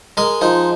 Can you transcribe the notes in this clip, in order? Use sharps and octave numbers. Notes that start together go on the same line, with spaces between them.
G#3 A#4 D#5
F3 D#4